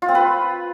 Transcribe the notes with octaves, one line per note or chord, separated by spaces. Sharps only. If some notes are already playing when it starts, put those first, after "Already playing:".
F4
C4
B4